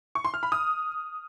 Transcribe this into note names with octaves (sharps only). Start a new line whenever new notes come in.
C#6
C6
F6
B5
D#6